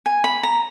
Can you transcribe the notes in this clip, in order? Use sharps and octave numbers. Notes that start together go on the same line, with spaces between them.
G#5
B5
A#5